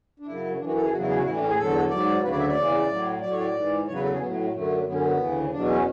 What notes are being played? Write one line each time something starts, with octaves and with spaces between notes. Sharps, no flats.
D4
F#2 C#3 F#3 E4
F#2 E3 D4
F#4
A4
G#4
E2 C#3 F#3 F#4
E4
G#4
F#4
A2 E3 E4
D4
C#4
G#4
E2 D3 F#3 A4
G#2 F#3 D5
D2 C#3 F#3 B4
D5
E5
D5
E2 C#3 E3
A2 F#3
A2 F#3 D5
C#5
D5
G#2 E3
E2 C#3 F#3 C#5
B4
A4
G#4
A2 F#3 B3
A3
A3
F#2 D3 F#3 A3
F#2 D3 F#3 B3
C#4
B3
D2 C#3 E3
E2 B2 F#3 D4
C#4